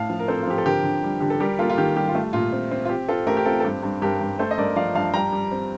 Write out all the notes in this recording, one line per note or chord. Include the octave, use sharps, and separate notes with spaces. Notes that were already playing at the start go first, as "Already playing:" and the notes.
Already playing: A2 F5 A5
F3
A#4
C4 A4 C5
F4
F3 G4
A4
D3 G4 A#4
D3
G3
D3 G4
A4
G3 G4 A#4
A#3 F4 A4
F4
D#3 G4
G3 G4
F4
A3
A#2 F4
C4
C4
F4
C4 G4
C4 F4 A4
A3 G4 A#4
G4
C4 F4 A4
A4
G2 G4
G2
G2 G4 A#4
G2
A3 A4 C5
D#5
G2 A#4 D5
F3 D5 F5
G2 F5 A5
G3 G5 A#5
G3
C4